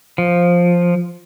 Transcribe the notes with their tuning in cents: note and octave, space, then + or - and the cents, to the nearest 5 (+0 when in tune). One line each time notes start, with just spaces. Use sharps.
F3 +5